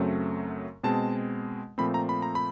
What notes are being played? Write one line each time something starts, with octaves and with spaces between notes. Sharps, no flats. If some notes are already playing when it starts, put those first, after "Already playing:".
Already playing: F#2 C#3 F#3 A3 C4
B2 G#3 C4 A5
A#2 F3 A3 C4 B5
A#5
B5
A#5
B5